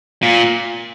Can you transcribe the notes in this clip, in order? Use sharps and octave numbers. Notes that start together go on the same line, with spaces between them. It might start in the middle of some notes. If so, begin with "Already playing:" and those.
A#2